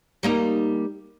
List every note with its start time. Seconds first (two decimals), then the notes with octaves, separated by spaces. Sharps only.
0.23 G3 A#3 D#4